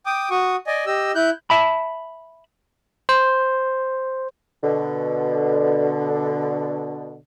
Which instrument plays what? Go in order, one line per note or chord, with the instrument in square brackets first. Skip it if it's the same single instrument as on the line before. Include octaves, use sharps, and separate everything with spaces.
[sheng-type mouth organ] G5 D6 D#6
F#4 C#6 D#6
D5 D#5 G#5
G4 D#5 E6
E4 F#6 G6
[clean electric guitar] E5 A5 B5
[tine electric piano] C5
[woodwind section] B2 D3